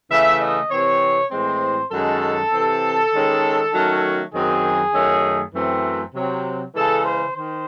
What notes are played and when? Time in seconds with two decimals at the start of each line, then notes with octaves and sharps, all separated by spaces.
0.10 C#3 E3 A3 E5
0.40 D#5
0.71 C3 E3 C4 C#5
1.31 A2 E3 G#3 C4 C5
1.91 F#2 D#3 G#3 C#4 A4
2.52 C3 E3 C4
3.12 D#3 G#3 C#4
3.73 D#3 F#3 A3 C#4
4.33 F#2 D#3 F#3 C4 G#4
4.94 F#2 D#3 A3 C#4
5.54 F#2 E3 A3 C4
6.15 C3 F#3 C4
6.75 C#3 E3 G#3 A4
7.05 C5
7.35 D#3 C5